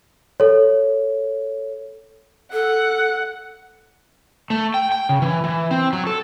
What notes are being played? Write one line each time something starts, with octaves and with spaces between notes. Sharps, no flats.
A4 C#5
A4 F#5
A3
G5
G5
C#3
E3
E3
C4
F#3
A4